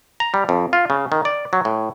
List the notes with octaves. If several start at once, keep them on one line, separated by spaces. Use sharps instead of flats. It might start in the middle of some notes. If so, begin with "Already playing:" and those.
A#5
G3
F2
F4
C#3
D#3
D5
F#3
A2